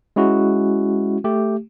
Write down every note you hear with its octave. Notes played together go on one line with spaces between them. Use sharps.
G#3 C#4 E4 F#4
A3 G4